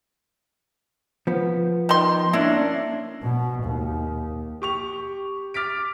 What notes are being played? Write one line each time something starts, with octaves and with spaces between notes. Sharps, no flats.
F3 B3
D#3 C6
A#3 C#4 D4 E4
B2
D#2
G4 C#6 F7
D6 F6 A6 B6 D7